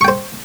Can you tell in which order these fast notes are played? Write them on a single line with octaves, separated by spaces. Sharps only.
C#6 G5 C5